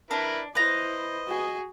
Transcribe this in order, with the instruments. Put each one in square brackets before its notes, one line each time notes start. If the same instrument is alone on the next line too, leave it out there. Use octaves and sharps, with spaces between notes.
[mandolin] D4 [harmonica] E4 A#4 B4
[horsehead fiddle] E4 C5 [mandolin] B4 A#5 [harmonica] D#5
[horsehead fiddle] F#4 G#4